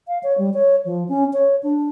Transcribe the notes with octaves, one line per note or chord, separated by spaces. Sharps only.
F5
C#5
G3
C#5
F3
C#4
C#5
D4